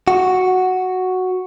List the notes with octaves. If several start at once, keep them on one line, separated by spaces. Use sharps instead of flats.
F#4